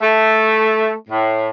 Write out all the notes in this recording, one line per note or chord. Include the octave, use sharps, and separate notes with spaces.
A3
A2